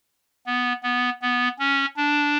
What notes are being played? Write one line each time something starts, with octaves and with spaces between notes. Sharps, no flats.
B3
B3
B3
C#4
D4